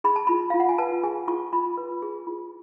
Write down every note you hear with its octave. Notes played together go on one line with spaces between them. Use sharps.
G#4 B5
A5
F4 B5
F4 F5
F#5
G#5
B4 A5
G#4 G#5
F4 C#6
F4 B5
B4
G#4
F4